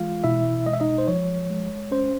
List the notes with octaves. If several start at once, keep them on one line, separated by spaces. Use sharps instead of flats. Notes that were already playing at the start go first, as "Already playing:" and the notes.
Already playing: E3 G#3 F4 F5
B2 E4 E5
G#3 D#5
E5
D#4 D#5
C5
F3 C#5
G#3
C#4 C5